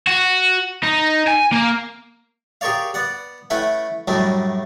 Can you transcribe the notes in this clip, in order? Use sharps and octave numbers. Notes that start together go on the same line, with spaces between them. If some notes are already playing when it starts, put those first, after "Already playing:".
F#4
D#4
G#5
A#3
G4 G#4 A#4 C#5 D5 F5
B3 D5 F#5
A3 C#4 E4 B4 F#5 G5
F#2 A2 F#3 G3 A3 D4